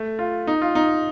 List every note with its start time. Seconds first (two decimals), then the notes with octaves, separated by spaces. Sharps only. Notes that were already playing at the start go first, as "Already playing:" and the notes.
Already playing: A3
0.19 F4
0.47 D#4
0.62 F4
0.75 D#4